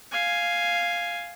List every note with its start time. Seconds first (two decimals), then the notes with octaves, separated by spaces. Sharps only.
0.12 F5 G#5